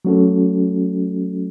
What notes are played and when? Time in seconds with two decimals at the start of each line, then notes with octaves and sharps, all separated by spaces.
0.05 F#3 A3 C#4 F#4 A4